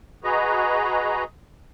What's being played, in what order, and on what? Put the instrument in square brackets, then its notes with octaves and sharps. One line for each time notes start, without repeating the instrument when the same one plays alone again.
[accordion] F#4 G#4 B4 D#5 A#5